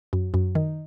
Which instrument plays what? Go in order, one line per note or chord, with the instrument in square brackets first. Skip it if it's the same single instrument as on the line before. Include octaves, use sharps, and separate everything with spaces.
[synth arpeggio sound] F#2
F#2
D#3